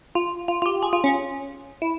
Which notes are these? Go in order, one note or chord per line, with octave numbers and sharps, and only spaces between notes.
F4
F4
F4
G4
G#4
F4
C#4
E4